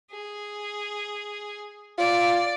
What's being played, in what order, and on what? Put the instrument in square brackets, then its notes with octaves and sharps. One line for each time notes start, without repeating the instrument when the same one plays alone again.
[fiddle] G#4
[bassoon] F4 [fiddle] D5